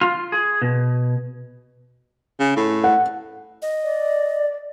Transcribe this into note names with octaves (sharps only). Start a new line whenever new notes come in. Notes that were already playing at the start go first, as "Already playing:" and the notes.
F4
G#4
B2
C#3
A2
F#5
D#5
D5